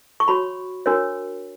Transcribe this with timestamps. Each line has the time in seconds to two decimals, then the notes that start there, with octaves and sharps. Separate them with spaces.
0.20 C#6
0.28 F#4 C#5 B5
0.86 D4 F#4 A#4 C#5